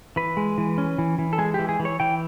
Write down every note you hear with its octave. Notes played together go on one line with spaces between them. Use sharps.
E3 B4
G#3
E3
C#4
E3
E3
A4
G#3 G#4
E3 G4
G#4
E3
C#5
E3 G5